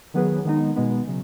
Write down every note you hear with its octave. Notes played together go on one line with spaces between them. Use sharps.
D#3 F#3 B3 G#4 B4
D#3 G#3 B3 D#4
B2 G#3 B3
C#3 F#3